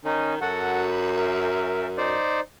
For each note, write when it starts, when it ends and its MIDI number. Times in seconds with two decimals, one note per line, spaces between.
0.05 0.38 51
0.05 0.34 61
0.05 0.34 63
0.41 2.16 42
0.41 0.88 66
0.41 0.88 69
0.41 0.88 78
0.91 1.09 83
1.17 1.87 70
1.17 1.87 76
1.98 2.40 63
1.98 2.40 72
1.98 2.40 74